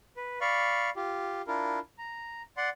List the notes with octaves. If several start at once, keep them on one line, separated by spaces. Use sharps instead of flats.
B4
D5 F5 B5 C#6
F4 G4
D4 E4 F4 A#4
A#5
D5 F#5 C6